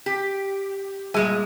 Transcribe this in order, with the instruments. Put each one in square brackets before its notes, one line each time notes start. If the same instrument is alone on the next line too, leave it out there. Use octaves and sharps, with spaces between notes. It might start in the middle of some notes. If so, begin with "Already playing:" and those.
[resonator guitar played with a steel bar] G4
[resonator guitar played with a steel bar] A#2 G#3 G#5 [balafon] G3 G#4